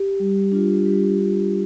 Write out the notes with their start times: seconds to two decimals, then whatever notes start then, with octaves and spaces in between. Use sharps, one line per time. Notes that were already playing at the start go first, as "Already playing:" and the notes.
Already playing: G4
0.20 G3
0.52 D4 F4
0.85 G3 G4
1.19 D4 F4